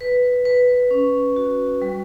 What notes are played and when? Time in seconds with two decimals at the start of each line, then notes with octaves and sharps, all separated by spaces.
0.01 B4
0.45 B4
0.91 C#4
1.36 F#4
1.82 G3